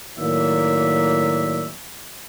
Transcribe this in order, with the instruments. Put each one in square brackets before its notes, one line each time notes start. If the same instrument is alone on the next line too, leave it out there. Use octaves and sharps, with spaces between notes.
[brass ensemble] A2 D#3 F#3 A#3 D5 E5